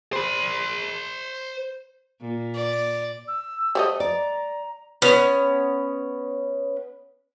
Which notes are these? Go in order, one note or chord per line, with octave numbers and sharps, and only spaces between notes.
C5 B5
A#2
D5
E6
G3 A3 C5 D#5
D5 A#5
B3 C#4